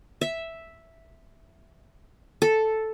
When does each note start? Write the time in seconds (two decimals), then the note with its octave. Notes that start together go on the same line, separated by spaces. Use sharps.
0.21 E5
2.42 A4